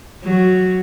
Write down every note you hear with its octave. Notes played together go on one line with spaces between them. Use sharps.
F#3